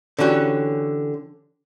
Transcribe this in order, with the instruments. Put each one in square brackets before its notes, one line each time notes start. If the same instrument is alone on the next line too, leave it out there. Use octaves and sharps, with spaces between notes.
[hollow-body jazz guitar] D3 E3 C#4 F#4 G4